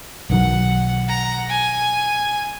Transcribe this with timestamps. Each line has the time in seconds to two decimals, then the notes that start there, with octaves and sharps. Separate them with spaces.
0.30 B1 D#3 F#3 F#5
1.07 F#5 A#5
1.49 G#5